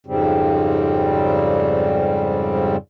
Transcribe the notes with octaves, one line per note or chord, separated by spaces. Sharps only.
F2 G#2 C#3 G3 C4